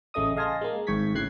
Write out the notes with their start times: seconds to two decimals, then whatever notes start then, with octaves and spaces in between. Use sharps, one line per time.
0.14 A1 C#3 A3 D#5 D#6
0.37 D#5 F5 G#5 A5 C6 A#6
0.61 G#3 A#3
0.87 G#1 G#2 C#6 G#6 B6
1.15 C#2 A2 C#3 F#6 G#6 C7